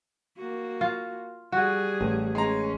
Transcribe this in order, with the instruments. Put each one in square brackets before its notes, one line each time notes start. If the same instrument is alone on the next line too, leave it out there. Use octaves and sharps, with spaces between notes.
[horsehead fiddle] A#3 F#4
[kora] F4
[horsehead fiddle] G3 G#4 [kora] F#4
[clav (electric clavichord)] A1
[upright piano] G#3 A#5 [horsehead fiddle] C#4